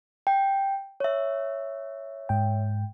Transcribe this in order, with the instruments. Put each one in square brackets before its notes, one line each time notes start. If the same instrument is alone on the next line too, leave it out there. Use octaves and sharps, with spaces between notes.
[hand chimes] G5
C#5 E5
[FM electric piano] G#2 G5